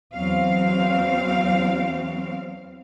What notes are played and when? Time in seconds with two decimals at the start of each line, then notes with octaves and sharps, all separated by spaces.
0.13 E2 F#3 C4 F5